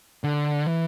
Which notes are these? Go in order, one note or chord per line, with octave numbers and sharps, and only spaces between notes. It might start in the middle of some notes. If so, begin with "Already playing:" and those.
D3
E3